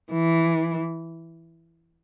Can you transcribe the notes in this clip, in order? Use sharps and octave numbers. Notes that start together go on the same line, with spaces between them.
E3